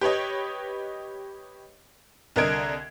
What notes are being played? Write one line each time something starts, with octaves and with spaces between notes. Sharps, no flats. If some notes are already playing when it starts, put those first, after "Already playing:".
G4 B4 C#5 D#5
C2 D3 A#4 D#5 G#6 D7